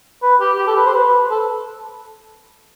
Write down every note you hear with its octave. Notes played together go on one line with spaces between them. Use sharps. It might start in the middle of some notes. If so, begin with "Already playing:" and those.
B4
G4
G4
A4
B4
C5
B4
A4